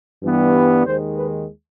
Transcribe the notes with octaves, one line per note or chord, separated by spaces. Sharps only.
G2 E3 G3 B3
B4
D#2 D#3 G#3 C5
B4